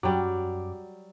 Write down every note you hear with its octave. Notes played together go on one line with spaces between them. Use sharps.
F#2 F#3 G3 D6